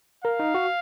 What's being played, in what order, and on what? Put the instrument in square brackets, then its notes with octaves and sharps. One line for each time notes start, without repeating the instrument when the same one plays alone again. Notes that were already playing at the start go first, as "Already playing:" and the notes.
[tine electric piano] A#4 [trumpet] F5
[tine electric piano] D#4
F#4